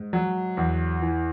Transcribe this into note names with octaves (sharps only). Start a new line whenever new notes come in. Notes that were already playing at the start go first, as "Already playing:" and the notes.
Already playing: G#2
F#3
E2
E3